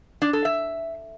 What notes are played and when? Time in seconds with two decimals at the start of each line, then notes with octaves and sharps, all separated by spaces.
0.22 D4
0.33 A4
0.45 E5